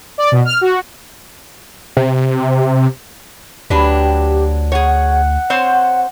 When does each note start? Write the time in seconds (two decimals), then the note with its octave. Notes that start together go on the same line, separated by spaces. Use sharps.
0.18 D5
0.32 B2
0.45 F6
0.61 F#4
1.97 C3
3.70 D2 F#3 D4 G4 B4
4.72 G#4 C#5 F#5
5.50 C4 C5 C#5